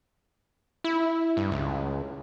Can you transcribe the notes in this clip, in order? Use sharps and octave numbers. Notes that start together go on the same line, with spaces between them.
E4
G2
C#2